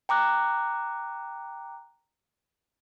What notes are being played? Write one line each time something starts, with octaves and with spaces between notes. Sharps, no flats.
G5 A#5 D6 F#6